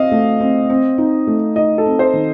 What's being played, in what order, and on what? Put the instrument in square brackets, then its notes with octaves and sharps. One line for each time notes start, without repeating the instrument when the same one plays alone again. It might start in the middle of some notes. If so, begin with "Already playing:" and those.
Already playing: [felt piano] C4 [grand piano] D#5 F5
[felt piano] A3
C4
C4
D#4
A3
[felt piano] D#4 [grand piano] D#5
[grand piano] A4
[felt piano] C4
[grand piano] C5
[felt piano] D#3